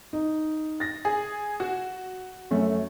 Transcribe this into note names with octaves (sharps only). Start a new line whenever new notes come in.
D#4
A6 A#6
G#4
F#4
F#2 A3 C#4